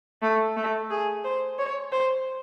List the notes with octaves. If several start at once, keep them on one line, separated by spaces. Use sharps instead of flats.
A3
A3
G#4
C5
C#5
C5